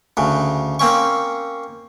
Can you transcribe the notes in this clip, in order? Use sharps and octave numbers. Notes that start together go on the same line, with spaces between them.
D2 C#3
A#3 C4 C#4 C#6